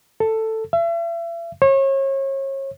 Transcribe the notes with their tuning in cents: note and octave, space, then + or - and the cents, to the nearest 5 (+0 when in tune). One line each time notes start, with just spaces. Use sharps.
A4 +10
E5 +40
C#5 -35